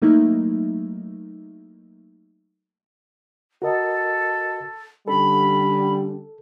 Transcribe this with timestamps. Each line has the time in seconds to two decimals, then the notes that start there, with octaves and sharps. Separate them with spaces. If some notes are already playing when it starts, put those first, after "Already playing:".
0.02 F#3 A3 A#3 D#4 E4
3.62 F#4 A4 A#4 D#5
5.08 D3 G3 C#4 A4 B5